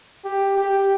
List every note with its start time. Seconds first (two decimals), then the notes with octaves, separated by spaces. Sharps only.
0.24 G4
0.57 G4